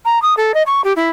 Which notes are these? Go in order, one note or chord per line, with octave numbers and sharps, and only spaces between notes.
A#5
D#6
A4
D#5
C#6
G4
E4